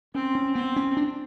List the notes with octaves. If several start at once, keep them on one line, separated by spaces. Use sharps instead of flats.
C4 C#4
C#4
B3 C4
C#4
D4